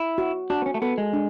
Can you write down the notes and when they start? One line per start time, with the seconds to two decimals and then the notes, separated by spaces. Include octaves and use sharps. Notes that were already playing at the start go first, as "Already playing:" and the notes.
Already playing: E4
0.18 F#4
0.50 D4 F#4
0.62 B3
0.66 C#4
0.74 A3
0.82 B3 A4
0.98 G#3
1.13 D4